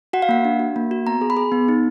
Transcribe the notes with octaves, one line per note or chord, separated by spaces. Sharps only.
F#4 F#5
F5
A#3 F#5
D4
F#4
A#3
F#4
B3 A#5
G#4
B5
G#4
B3
D#4